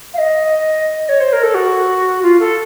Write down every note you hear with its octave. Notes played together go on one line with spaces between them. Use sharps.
F5
D#5
C#5
C5
A#4
A4
F#4
F4
A4